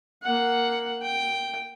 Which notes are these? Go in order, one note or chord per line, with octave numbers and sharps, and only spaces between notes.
A#3 F#5
G5